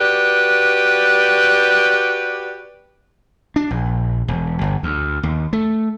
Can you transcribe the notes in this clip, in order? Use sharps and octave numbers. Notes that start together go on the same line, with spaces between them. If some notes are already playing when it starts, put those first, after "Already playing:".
F#4 G4 B4 D5
D4
A#1
E1
G1
D2
D#2
A3